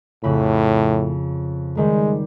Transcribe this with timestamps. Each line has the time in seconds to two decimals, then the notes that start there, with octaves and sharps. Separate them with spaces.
0.24 F2 A2 C#3 B5
1.77 D#3 G3 G#3